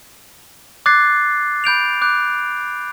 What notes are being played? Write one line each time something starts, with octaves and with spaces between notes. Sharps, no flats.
D6 F#6 G#6 A6 C7
B5 G6 D7 F7
D6 F#6 G6